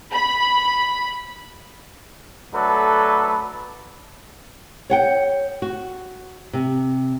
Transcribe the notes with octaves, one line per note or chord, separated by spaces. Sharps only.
B5
F#3 A3 D4 A4 B4
C#5 F#5 G5
F#4
C3